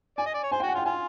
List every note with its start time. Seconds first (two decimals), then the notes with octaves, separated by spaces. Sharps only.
0.18 D5 G#5
0.26 D#5
0.34 D5
0.43 C#5
0.51 C5 G#5
0.60 G5
0.63 F#4
0.69 F#5
0.75 F4
0.78 G5
0.85 F4 G#5